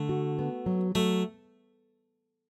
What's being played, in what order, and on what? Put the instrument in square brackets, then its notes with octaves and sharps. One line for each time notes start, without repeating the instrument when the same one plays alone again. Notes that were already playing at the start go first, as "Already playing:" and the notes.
Already playing: [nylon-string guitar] D3 [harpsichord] A3
[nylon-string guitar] F#4
B3
F#3
[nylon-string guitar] F#3 [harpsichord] A3